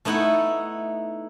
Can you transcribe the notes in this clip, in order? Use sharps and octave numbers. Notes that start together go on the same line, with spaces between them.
A3 B3 D#4 E4 A4 F#5